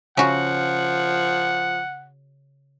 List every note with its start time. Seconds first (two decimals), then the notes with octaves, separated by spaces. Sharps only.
0.17 C#3 F3 F#4 F#5